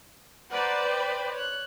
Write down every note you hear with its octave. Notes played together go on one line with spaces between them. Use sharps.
B4 C5 D5 F#5 A#5
G5 B5
C#5 F#6